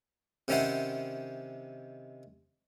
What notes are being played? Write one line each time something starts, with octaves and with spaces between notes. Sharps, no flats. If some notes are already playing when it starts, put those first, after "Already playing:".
C3 D#3 C#4 E4 C5 F#5